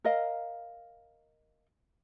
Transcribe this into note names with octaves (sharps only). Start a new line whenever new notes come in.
A#4 D#5 F5